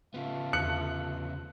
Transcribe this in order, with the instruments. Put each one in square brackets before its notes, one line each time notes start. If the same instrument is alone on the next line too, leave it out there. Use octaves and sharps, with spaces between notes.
[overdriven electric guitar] C#3 B3 [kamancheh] A3 F4
[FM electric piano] E2 D3 [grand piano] F#6 C#7 F#7